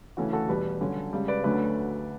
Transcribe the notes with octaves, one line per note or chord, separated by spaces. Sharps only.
D2 C#3 E3 A3 C#4 F#4
F#4 A4
E2 B2 G3 G4 B4
G2 D3 F#3 C#4
C#2 C#3 G3
B4 D5
D2 D3 F#3 A3 C#4 B4 D5